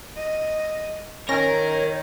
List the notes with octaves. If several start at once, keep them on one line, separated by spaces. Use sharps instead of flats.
D#5
D#3 C#4 A#4 C#5 A#6